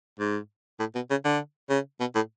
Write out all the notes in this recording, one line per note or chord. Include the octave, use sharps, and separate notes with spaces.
G#2
A2
B2
C#3
D3
C#3
B2
A2